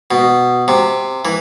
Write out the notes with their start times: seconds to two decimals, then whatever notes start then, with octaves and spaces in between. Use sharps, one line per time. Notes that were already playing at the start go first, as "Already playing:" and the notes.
0.11 B2
0.68 C3
1.25 E3